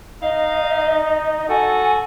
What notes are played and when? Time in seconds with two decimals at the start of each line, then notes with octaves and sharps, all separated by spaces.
0.22 D#4 D#5 F5
1.49 F#4 A4 G#5